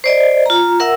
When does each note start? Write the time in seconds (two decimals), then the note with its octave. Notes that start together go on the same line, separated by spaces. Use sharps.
0.04 C5 D5 D#5
0.46 F4 A#5
0.80 A#4 E5 F#5 E6